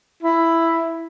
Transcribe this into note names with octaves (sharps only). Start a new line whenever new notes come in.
E4